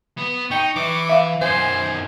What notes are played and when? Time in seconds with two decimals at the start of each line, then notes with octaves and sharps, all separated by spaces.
0.18 B3
0.51 D#4 G5 C#6
0.76 E3 D6
1.09 E5 F5
1.41 F#2 D#3 C5 G#5